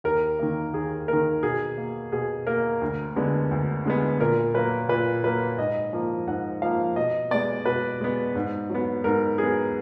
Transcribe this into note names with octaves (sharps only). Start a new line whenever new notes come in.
D#2 A#4
D#3 A#3
D#2 G#4
D#3 A#3 A#4
B2 G#4
A#3
B2 G#4
A#3 A#4
D2
D3 G#3 B3
D2
D3 G#3 B3
A#2 A#4
F#3 A#3 B4
A#2 B4
F#3 A#3 B4
G#2 D#5
F3 A#3
G#2 F#5
F3 A#3 F5
B2 D#5
G#3 B3 D5
B2 B4
G#3 B3
G#2
F#3 B3
G#2 A#4
F#3 B3 G#4